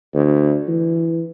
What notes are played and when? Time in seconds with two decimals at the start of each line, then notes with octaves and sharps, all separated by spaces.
0.14 D2
0.68 E3